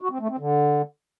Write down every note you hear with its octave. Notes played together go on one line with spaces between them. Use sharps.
F#4
C4
A3
C4
D3